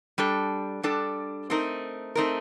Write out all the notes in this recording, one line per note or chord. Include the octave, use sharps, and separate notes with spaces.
G3 D4 A4
G3 D4 A4
A3 C4 D#4 A#4
A3 C4 D#4 A#4